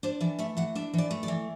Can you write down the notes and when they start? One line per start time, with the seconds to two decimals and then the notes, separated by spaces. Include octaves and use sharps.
0.03 D4 C5
0.20 E3 D5
0.39 A3 E5
0.57 E3 F#5
0.75 D4 E5
0.94 E3 D5
1.11 A3
1.23 D5
1.28 E3